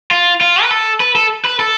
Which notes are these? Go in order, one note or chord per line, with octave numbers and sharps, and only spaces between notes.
F4
F4
B4
A4
B4
A4
B4
A4